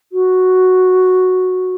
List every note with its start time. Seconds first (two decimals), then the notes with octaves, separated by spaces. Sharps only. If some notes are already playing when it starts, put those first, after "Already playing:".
0.12 F#4